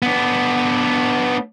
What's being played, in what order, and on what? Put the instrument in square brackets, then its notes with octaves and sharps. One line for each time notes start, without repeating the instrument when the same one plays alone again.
[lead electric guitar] B3 D4